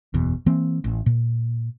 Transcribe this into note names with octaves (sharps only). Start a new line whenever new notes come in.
F#1 E2 B2
E3 A#3 C4
A1
A#2